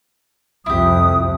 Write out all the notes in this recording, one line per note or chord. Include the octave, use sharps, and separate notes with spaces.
C2 F2 E4 G4 D#6